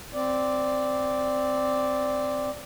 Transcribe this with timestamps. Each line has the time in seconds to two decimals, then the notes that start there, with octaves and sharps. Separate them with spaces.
0.14 C4 D5